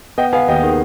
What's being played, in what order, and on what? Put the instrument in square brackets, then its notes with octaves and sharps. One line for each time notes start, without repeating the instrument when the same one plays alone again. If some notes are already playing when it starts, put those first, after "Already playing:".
[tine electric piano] B3 [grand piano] D#5 G5
[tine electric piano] B3 [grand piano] F5 G#5
[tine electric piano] D#2 [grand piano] D#5 G5
[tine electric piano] D#3 [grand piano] G#4